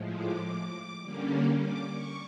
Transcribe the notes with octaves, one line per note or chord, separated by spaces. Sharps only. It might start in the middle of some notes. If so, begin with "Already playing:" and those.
Already playing: A2 F3 G#3
D6
D6
D3 G3 A#3 C#4
D6
C#6